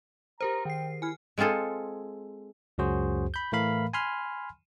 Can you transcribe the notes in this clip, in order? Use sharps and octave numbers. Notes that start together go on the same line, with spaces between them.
G4 A#4 C5 A#5
D#3 G5 C7
E4 G#5 F6
G#3 C4 F4 G#4 A4
C#2 F#2 F#3 F#4 G#4 C5
B5 G6
A2 E3 A3 A#4 F5 B5
G#5 B5 C6 F6